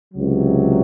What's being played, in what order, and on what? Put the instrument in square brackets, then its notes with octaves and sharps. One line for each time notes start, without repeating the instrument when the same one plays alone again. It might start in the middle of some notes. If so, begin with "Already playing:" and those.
[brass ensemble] C#2 C3 F#3